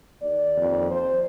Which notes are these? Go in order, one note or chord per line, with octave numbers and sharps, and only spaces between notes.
D#2 D5
F2
C5